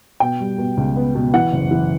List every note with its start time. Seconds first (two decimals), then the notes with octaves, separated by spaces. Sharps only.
0.20 B2 G5
0.40 G3
0.58 B2
0.77 C#2
0.96 B3
1.15 B2
1.34 E3 F#5
1.52 F#1
1.71 E3